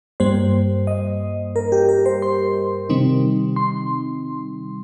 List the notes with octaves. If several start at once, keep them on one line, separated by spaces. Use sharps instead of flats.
G2 G3 A#3 C5
D#5
A#4
G4
A#4
C5
C6
C3 D#3 G3 C4 D#4
C6